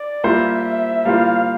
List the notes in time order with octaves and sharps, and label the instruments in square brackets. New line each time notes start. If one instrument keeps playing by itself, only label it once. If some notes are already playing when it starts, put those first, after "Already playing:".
Already playing: [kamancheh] D5
[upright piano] G3 A#3 F4 C5 [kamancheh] E5
[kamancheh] E5
[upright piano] G3 A#3 F4 C5 [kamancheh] F5